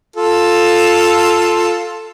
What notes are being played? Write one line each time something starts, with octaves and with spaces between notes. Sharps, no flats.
F4 A4